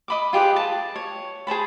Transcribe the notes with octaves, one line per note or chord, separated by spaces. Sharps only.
D#5 B5 D6
F4 G4 G#4 B4
A5
C#5
G#4 C5 A5 B5